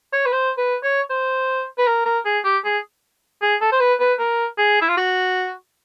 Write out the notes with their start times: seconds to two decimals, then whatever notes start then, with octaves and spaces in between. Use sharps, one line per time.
0.13 C#5
0.25 B4
0.32 C5
0.58 B4
0.83 C#5
1.10 C5
1.78 B4
1.87 A#4
2.05 A#4
2.25 G#4
2.44 G4
2.65 G#4
3.42 G#4
3.61 A4
3.72 C5
3.80 B4
4.00 B4
4.19 A#4
4.58 G#4
4.81 E4
4.89 F4
4.97 F#4